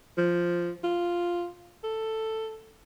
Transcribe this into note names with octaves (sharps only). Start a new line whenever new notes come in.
F3
F4
A4